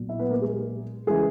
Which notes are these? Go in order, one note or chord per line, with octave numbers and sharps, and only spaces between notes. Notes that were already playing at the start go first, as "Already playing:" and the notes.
Already playing: B1 A#2 F#3
E4 E5
B3 B4
A#3 A#4
G#3 G#4
C#3 E3 G#3 G#4